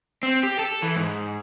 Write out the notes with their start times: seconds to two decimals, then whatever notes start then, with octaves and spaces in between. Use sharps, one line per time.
0.23 C4
0.43 G4
0.59 A4
0.83 E3
0.96 G#2